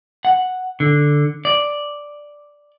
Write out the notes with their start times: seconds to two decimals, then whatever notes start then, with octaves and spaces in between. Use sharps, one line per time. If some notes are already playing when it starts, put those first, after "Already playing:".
0.25 F#5
0.80 D3
1.45 D5